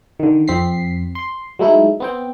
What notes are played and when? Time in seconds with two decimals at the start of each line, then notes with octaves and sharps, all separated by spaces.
0.19 D3 D#3
0.48 F2 C4 B6 C7
1.15 C6
1.59 F#3 G#3 A3 D#4 E4
2.00 B3 C4 G5